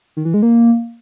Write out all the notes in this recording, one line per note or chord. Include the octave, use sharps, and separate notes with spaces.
D#3
E3
G#3
A#3